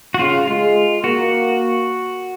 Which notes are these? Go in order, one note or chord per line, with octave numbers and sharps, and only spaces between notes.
F#4
C#3 F4
G#3 F4
A#3 F#4